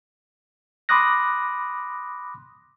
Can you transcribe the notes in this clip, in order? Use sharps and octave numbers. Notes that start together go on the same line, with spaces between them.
B5 C6 D6 D#6 F#6 A#6